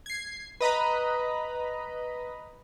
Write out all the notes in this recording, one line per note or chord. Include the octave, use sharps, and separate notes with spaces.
G#6 C7
B4 D#5 A#5 B5